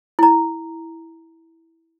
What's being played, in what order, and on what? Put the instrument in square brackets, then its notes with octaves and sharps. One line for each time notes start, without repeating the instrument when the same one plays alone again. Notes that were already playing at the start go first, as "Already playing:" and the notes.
[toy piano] E4 A#5